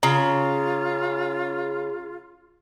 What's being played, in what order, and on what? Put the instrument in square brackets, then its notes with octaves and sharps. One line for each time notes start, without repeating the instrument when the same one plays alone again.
[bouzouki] C#3 [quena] F4 [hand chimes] A#5